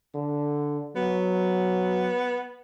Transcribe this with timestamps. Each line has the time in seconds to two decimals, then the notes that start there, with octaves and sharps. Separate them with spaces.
0.15 D3
0.96 F#3 B3